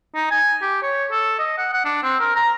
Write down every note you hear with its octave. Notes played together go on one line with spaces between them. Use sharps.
D#4
G#5
G4
C#5
A4
D#5
F#5
F#5
D4
C4
A#4
A#5